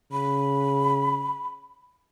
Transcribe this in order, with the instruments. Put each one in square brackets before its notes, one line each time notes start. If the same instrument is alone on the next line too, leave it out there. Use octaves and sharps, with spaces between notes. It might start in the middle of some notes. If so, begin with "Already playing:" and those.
[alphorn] C#3 [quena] B5